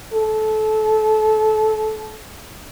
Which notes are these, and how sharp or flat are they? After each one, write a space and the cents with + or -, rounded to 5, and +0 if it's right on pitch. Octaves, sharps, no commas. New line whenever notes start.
A4 -25